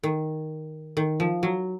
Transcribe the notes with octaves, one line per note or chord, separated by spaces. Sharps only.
D#3
D#3
F3
F#3